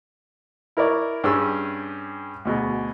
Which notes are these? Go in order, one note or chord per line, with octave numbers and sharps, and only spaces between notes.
E4 A#4 C#5 D5
G2 C#4 G4 G#4 E6
D2 B2 G#4